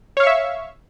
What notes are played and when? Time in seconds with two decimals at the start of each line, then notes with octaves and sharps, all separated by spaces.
0.17 C#5
0.20 F5
0.23 C#6
0.27 E5